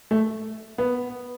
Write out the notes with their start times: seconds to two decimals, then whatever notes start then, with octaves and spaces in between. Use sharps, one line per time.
0.11 A3
0.78 B3